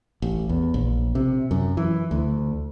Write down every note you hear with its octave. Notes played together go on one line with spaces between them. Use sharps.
A1
E2
A#1
C3
F#2
E3
D2